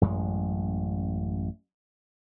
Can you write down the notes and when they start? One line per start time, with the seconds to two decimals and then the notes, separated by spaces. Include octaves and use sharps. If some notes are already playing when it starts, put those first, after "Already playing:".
0.01 A1 F#2 G#3